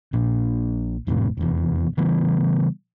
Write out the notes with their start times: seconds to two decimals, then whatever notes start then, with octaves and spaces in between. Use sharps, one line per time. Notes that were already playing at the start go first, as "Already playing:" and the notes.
0.13 A#1 A#2
1.07 G#1 F2 A2 C3
1.37 F1 E2
1.97 C#3 E3 G3 B3